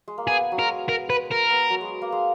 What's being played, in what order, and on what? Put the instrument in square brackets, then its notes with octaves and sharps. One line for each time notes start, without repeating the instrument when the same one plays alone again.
[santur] G#3
A#3
[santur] B3 [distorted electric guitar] G#4
[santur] F#3
[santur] G#3 [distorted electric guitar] A#4
[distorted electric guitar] A#4
B4
A#4
[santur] B3
F#3
G#3
A#3
G#3